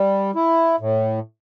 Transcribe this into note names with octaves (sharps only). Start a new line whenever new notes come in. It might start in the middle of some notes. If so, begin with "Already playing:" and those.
Already playing: G3
E4
A2